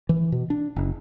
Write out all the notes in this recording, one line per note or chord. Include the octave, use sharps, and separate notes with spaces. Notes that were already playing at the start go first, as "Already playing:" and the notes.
E3
B2
D4
F#1